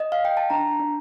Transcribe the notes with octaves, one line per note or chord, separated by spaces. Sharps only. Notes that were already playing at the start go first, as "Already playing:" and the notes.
D#5
F5
G5
A5
D4 A#5
D4